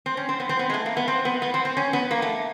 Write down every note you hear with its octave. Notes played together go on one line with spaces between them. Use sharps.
C4
C#4
C4
B3
C4
B3
G#3
A3
A#3
B3
C4
B3
B3
C4
C4
C#4
B3
A#3
A3